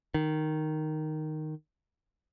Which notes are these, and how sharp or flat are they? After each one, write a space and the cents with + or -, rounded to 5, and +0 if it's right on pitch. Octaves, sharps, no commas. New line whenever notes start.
D#3 -5